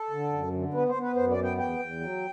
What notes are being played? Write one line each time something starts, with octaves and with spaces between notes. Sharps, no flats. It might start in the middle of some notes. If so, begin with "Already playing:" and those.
Already playing: A4
D3
F#2
D3
B3 B4
C5
B3
B4
F#2 C5
D5
B3
G5
E2 G5
E2
F#3